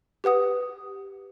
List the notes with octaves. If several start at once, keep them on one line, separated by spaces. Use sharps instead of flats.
G4 B4 F#5 D#6